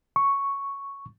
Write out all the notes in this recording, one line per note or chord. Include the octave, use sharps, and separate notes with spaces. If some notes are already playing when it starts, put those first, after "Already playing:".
C#6